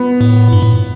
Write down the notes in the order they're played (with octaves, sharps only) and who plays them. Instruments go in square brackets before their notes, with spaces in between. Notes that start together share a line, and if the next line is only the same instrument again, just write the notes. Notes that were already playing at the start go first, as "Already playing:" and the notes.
Already playing: [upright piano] B3
[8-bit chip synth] A2
G2
A2